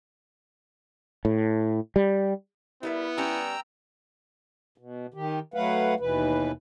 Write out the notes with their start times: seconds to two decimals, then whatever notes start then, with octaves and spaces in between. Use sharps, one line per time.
1.25 A2
1.96 G3
2.83 G3 B3 E4 A#4 E5
3.18 G3 C#4 G5 A#5 E6
4.78 B2
5.14 D#3 G4
5.54 F#3 A3 B4 F5 F#5
6.00 D#2 B2 E3 B4